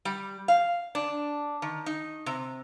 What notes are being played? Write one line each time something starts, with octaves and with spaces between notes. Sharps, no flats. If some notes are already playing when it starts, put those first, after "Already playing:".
G3
F5
D4
D#3
D#4
C3